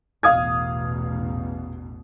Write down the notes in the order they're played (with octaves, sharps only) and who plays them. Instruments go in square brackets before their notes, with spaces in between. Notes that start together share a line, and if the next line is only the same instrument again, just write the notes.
[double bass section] A1 E2 B2 [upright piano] F5 D#6 G#6